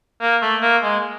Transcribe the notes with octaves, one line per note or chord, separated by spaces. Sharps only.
A#3
A3
A#3
G#3